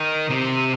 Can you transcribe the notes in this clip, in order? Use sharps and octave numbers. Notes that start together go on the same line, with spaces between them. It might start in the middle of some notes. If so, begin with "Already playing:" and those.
Already playing: D#3
C3